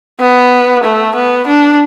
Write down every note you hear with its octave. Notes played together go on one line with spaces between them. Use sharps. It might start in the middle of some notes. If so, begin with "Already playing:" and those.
B3
A3
B3
D4